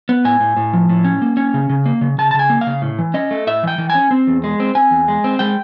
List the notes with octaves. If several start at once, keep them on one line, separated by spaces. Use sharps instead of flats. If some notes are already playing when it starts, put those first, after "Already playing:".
B3
A2 G#5
A2
A2
F3
A2
C#4
A#3
C#4
C#3
C#3
A#3
C#3
C#3 A5
A5
C#3
G#5
A#3
F5
C#3
A2
E3
C#4 D#5
A3
A2 E5
E3 G5
E3
G#5
C#4
C4
E2
G#3
C4
C4 G#5
E2
G#3
C4
G#3 G5